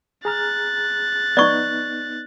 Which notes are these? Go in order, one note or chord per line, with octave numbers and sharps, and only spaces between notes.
G#4 A#5 F6 F#6 A6
B3 D#4 D5 C#6